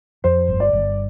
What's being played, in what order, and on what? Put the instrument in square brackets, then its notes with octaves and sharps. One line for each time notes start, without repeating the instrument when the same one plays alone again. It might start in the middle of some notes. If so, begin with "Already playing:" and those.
[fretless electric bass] F2 [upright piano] C5
[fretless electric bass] G1
[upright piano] D5
[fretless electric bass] G1